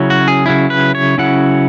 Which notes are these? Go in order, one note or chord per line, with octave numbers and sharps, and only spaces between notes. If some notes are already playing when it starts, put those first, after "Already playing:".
Already playing: C#3 F#3 C#4 E4
F#4
G#4
C#3 F#3 C#4 E4
B4
C#5
C#3 F#3 C#4 E4 F#5